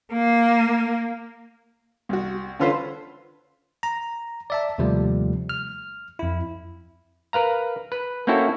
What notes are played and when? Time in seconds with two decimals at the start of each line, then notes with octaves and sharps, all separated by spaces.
0.13 A#3
2.09 C2 F#4
2.59 D3 C#4 F4 A4 B4 C5
3.83 A#5
4.50 D5 E5 A5
4.78 D#2 C3 F3 G3 A3
5.49 F6
6.19 F2 E4
7.33 A#4 B4 F5 A#5
7.92 B4
8.27 A#3 C4 C#4 E4 F#4 A4